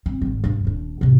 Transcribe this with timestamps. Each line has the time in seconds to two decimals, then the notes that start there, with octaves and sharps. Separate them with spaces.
0.06 C4
0.22 D#1 G#1
0.44 G2 D4
0.65 D#1 D4
1.01 G#2 C3